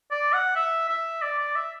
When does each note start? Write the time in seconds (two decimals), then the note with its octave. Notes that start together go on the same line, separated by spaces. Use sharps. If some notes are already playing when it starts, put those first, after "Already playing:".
0.11 D5
0.33 F#5
0.56 E5
0.89 E5
1.22 D5
1.38 D5
1.56 E5